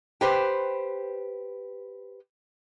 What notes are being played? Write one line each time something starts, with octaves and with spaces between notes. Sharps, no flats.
G4 B4 C5